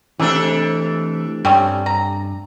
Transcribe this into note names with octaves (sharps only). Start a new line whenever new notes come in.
C3 E3 G#3 A3 D4 A4
G2 G3 C4 C#4
A#5